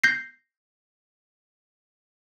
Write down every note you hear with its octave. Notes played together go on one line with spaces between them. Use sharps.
G6 A#6 C7